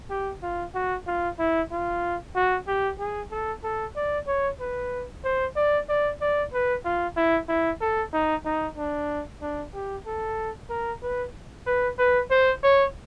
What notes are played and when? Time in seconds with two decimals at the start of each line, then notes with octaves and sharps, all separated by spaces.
0.10 G4
0.43 F4
0.75 F#4
1.07 F4
1.39 E4
1.71 F4
2.36 F#4
2.68 G4
2.99 G#4
3.31 A4
3.64 A4
3.96 D5
4.27 C#5
4.60 B4
5.24 C5
5.56 D5
5.89 D5
6.21 D5
6.53 B4
6.85 F4
7.17 E4
7.49 E4
7.81 A4
8.13 D#4
8.45 D#4
8.78 D4
9.42 D4
9.74 G4
10.06 A4
10.70 A#4
11.02 B4
11.67 B4
11.98 B4
12.31 C5
12.63 C#5